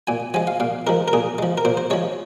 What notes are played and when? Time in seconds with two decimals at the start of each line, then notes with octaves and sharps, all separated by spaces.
0.07 A#2 G#5
0.34 F3 G#3 G#5
0.47 F5
0.60 A#2 F5
0.87 F3 G#3 A#4
1.08 A#4
1.13 A#2 G#4
1.38 F3 G#3
1.58 A#4
1.65 A#2 C5
1.77 C5
1.90 F3 G#3 C#5